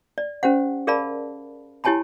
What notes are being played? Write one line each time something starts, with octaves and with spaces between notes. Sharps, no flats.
D5
C#4 G4 C5 F#5
G#4 A#4 D5 F5 A5 B5
E4 G4 C#5 G#5 A5 B5